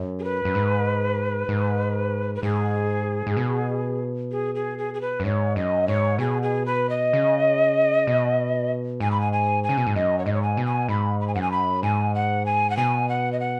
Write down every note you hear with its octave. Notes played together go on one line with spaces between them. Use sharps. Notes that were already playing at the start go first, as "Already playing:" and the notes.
Already playing: F#2
G#4
B4
F#2
G#2
G#2
B4
G#2 G#4
G#2
B2
G#4
G#4
G#4
G#4
B4
F#2
G#2 C#5
F#2 D#5
G#2 C#5
B2 G#4
G#4
B4
D#5
C#3
B2
G#2 G#5
B5
G#5
G#5
G#5
C#3
B2
G#2
F#2 D#5
C#5
G#2 D#5
C#5
G#5
B2
G#5
G#2 B5
B5
G#5
F#2 F#5
G#5
B5
G#2 G#5
F#5
G#5
F#5
B2 G#5
F#5
D#5
F#5